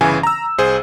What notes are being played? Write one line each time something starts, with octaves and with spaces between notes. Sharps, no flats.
G1 C#3 E3 G#5
A#5 E6
C2 G#4 C5